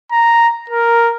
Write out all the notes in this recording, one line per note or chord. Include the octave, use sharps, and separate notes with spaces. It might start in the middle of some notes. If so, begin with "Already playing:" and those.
A#5
A#4